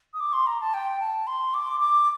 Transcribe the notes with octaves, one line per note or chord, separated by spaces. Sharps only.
D#6
D6
C6
A#5
A5
G5
A5
C6
D6
D6